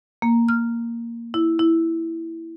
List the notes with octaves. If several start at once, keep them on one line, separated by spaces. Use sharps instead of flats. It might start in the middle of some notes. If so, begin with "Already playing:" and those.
A#3
F6
E4
E4